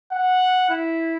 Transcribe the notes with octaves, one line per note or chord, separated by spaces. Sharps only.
F#5
E4